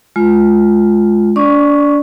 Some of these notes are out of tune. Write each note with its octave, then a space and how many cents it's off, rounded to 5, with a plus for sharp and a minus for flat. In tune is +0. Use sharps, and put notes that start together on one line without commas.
G#3 +25 F4 +0
D4 -30 D5 +5 C#6 +0